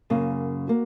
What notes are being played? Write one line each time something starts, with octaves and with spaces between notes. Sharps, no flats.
F#2 C#3 A#3
A#3 F#4